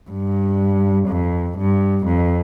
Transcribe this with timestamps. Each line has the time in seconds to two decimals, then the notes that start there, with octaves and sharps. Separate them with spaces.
0.10 G2
1.09 F2
1.58 G2
2.06 F2